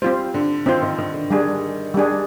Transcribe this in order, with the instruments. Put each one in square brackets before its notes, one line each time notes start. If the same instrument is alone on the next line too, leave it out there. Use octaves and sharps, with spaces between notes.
[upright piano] G3 [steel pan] C4 F4 C5
[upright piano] D3
[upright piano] D#3 [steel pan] C4 F4 C5
[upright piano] D#3
D#3
D3
[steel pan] G3 D4 G#4
G3 D4 G#4